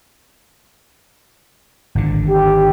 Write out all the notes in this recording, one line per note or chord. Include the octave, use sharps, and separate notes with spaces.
G#1 D3
G4